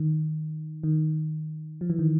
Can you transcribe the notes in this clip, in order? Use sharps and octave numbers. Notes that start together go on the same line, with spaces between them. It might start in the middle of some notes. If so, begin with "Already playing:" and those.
Already playing: D#3
D#3
F3
E3
D#3